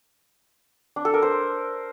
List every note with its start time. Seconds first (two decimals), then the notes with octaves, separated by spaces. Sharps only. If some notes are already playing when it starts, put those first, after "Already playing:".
0.96 D4
1.05 A4
1.14 A#4
1.22 C5